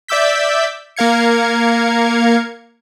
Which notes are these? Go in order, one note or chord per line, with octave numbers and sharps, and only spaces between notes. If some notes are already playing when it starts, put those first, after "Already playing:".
D5 E5 D6 E6 G6 B6
A#3 A#4 F5 G#6 C#7